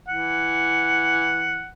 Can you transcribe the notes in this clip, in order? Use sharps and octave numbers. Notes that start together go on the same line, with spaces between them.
E3 F#5